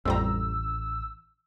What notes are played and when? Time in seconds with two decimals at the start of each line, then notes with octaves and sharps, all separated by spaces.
0.05 A1 F2 G3 A#5 E6